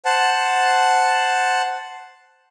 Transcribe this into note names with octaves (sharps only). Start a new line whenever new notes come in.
C5 F#5 A5